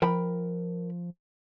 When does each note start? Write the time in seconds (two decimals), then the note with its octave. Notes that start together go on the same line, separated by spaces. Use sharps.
0.02 F3 A#4 G5 B5